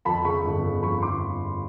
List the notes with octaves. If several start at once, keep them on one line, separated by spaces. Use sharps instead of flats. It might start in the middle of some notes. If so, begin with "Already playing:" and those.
F2 A5 B5
C#3 B5 C#6
G1
C#3
F2 B5 C#6
G1 C6 D6